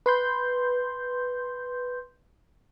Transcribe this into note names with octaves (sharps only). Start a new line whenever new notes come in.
B4 C6 G6